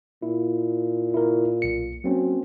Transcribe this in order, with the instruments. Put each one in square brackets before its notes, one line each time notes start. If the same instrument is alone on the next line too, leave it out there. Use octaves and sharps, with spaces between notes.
[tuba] A#2 [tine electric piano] E4
[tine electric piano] E4 A#4
B1 C#7
[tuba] F#3 [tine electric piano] A#3 C4 C#4